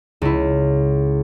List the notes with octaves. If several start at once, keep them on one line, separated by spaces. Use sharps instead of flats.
C#2 E4